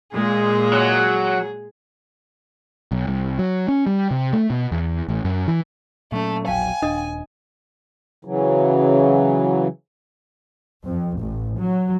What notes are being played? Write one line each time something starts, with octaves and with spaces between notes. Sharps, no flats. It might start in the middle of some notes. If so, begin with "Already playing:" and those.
A#2 G#3 G#4
F#3
B1
C2
F#3
C#4
G3
C3
A3
B2
E2
A1
F#2
E3
A#2 F#3 A3 C#4
E1 A#1 F#3 F5 G5 G#5
D#1 D4 D#5 D#6
C#3 E3 F#3
F2
A1
F#3